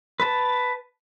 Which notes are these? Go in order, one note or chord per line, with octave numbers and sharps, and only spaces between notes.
B4 A5